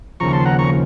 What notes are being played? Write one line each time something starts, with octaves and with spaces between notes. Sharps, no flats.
D#2 C#3 F3 A#5 C#6
A5 C6
F#5 A#5
A#5 C#6